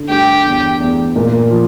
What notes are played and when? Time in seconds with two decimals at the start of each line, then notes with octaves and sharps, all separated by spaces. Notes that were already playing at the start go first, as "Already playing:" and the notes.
Already playing: D3
0.08 G2 G4
0.45 E2
0.80 E2
1.16 A#2
1.51 F3